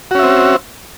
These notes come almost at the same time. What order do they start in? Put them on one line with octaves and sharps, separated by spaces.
F#4 C#4 E5 C4